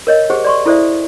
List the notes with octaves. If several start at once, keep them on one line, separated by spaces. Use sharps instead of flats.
A#4 C#5 D#5
G4 G#4 C5 F#5
D5 C6 C#6
E4 A4 C5 D5 E5